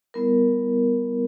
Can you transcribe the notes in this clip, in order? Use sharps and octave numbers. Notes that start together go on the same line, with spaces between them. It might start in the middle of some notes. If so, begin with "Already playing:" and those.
G3 B3 E4 A#4